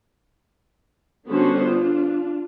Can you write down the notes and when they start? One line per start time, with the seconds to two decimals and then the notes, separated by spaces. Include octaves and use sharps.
1.29 D3 G3 B3 C#4 F#4 C5
1.61 D4 F4